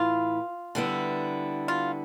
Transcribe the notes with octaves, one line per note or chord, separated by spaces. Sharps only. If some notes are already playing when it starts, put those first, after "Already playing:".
Already playing: A2 E3 E4 F4
D3 G3 B3 E4
F4